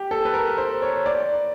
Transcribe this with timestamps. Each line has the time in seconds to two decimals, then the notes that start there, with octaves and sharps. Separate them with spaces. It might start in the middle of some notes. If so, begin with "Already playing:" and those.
Already playing: G4
0.11 A4
0.25 B4
0.34 A#4
0.58 C5
0.82 C#5
1.06 D5